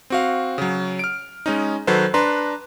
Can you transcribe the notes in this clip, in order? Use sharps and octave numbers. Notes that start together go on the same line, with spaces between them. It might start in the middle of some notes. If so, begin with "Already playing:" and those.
C4 F#4 F5
C#3 F#3
F6 D7
G#3 C#4 D#4
D#3 F#3 A4 B4 C5
D4 B4 A#5 C6